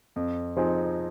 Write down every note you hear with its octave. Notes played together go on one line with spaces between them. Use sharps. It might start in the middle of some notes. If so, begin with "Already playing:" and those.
F2
F3 C4 D#4 G#4